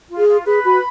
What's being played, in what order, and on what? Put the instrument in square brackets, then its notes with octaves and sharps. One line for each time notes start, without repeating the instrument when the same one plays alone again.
[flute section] F4
[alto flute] G#4
[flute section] F4
[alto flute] G#4 [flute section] B4
[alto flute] F#4 [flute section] B5